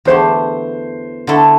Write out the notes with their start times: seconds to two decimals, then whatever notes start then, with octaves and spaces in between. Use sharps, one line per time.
0.05 E2 D3 A3 E4 G4 C5
1.27 D3 A3 E4 A4